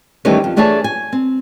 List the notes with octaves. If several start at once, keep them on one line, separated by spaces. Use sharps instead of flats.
D#3 E3 G3 A3 C#4
F2
E3 A3 D4 G#4 C#5 A5
G#5
C4